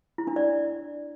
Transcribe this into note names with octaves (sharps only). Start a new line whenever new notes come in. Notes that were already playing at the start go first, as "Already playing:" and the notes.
E4
D4
D5